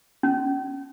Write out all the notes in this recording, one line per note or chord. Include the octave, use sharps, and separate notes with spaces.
C#4